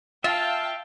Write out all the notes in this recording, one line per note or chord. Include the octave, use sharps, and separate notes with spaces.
F4 E5 F5 G5 A5